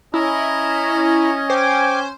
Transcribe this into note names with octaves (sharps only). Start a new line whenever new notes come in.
C#4 E4 D#5 A#5
C5 G5 G#5 D6